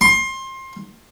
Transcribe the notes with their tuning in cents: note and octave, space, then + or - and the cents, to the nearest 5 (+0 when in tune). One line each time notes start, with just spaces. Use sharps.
C6 +25